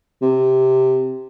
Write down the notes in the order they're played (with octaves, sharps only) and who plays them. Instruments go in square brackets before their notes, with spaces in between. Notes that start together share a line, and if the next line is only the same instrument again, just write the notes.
[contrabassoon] C3